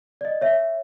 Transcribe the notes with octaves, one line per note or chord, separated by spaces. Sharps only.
D5 D#5
C#5 E5